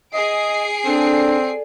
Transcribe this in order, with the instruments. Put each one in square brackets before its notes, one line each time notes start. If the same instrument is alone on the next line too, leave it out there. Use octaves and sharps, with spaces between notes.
[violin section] G#4 C7 D7 [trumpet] D#5
[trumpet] C4 [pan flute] D4 [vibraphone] A4 D5